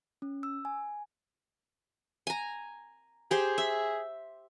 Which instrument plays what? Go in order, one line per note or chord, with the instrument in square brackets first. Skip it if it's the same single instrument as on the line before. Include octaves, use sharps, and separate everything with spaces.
[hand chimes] C#4
E6
G#5
[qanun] G#5 A#5
[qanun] G4 C5 [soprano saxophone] G#4
[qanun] E5